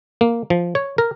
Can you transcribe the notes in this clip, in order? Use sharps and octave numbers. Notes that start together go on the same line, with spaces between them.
A#3
F3
C#5
A#4